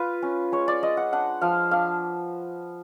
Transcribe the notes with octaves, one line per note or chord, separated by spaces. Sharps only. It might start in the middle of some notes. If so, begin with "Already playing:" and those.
Already playing: F4 B4
C#4
G#3 C#5
D5
G#3 D#5
F#5
D4 F#5
F3 F5
D4 F5